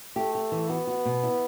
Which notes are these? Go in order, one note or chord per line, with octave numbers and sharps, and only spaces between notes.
A3 G4
G4
E3
B3 F#4
F#4
B2
E4